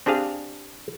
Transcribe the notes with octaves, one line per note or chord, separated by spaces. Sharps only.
C4 D4 G4 G#4 F5